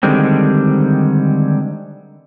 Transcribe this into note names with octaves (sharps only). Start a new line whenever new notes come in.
D3 D#3 G3 G#3 C4